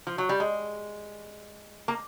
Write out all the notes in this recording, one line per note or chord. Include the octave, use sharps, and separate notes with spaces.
F3
F#3
G3
G#3
A#3